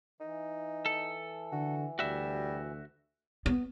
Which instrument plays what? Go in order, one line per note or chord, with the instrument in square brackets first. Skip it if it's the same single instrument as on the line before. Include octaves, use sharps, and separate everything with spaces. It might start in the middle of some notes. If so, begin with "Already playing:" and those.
[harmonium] E3 [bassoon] D#4
[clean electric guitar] A4
[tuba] D3 [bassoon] F#4
[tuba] D2 [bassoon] G3 [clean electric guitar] F#4 E5
[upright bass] B3